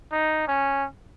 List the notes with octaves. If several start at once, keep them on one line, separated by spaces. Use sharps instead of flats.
D#4
C#4